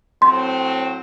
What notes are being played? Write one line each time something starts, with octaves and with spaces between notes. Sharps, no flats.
A2 F#3 C4 C6